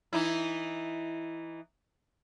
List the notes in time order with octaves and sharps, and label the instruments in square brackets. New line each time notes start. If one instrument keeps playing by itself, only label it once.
[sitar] E3 D#4 E4